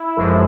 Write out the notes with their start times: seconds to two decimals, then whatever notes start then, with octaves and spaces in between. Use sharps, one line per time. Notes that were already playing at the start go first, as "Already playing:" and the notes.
Already playing: E4
0.17 G1 F#2 D3 F3 G#3